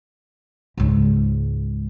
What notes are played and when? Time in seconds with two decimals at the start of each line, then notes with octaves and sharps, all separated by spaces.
0.78 C#2 G#2